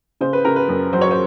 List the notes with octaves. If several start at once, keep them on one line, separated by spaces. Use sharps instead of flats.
C#3 C5
B4
C#3 A#4
B4
F#2
F#3 C5
C#5
C5